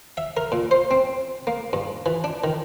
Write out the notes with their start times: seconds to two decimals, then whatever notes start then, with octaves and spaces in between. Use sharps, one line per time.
0.17 E5
0.37 A#4
0.52 A#2
0.71 C5
0.91 C4
1.47 A#3
1.73 G2
2.06 E3
2.24 D4
2.44 D#3